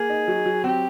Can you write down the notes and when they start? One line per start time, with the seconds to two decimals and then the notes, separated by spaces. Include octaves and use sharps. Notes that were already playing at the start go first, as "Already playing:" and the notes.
Already playing: A#3 G#4
0.10 D#4
0.28 F#3
0.46 F#3
0.64 C4 G4